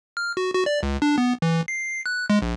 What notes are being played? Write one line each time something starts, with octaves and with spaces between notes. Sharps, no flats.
F6
F#4
F#4
D5
C#2
D4
B3
E3
C7
F#6
G#3
A#1